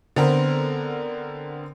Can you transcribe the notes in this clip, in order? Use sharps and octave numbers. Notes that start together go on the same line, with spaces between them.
D3 B3 C4 A#4